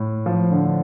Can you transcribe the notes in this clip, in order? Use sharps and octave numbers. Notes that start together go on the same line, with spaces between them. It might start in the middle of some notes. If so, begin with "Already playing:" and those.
Already playing: A2
F3
D3